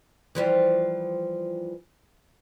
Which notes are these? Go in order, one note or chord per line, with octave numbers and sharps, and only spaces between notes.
E3 F3 G3